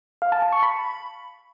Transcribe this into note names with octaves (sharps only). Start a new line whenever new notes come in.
F5
A5
A5
C#6
B5